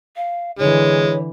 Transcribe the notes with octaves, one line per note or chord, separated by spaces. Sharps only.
F5
D3 E3 G#3 C#5